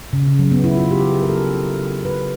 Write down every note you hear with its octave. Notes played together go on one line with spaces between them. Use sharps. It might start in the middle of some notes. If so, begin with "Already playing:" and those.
C#3
C#3
F#3
B3
E4
F4
G4
G#4
A#4
A4
B4